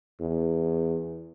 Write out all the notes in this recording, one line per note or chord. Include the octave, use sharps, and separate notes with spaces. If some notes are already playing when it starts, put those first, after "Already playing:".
E2